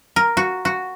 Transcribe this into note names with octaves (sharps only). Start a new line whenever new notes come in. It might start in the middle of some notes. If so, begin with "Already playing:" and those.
A#4
F#4
F#4